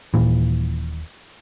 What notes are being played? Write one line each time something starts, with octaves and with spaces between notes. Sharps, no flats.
D#1 A#2 E3